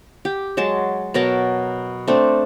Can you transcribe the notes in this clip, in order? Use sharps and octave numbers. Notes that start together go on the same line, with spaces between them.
G4
F#3 G#3 A5
B2 F#3 A#4 A5
A3 C4 D4